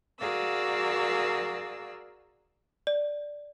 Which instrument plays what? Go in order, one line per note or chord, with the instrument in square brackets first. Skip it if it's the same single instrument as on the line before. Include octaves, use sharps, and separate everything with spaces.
[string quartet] F#4 G#4 A#4 D5 F5 E6
[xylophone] D5